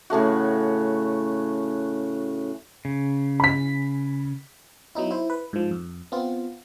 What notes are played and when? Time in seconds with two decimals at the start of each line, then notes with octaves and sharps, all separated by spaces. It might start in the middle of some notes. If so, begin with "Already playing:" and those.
0.10 A2 C#3 A3 F#4
2.85 C#3
3.40 B5 B6
4.95 F#3 B3 D#4 E4
5.11 E4 C5
5.30 B4
5.53 G#2 F3
5.71 F2
6.12 B3 C4 F4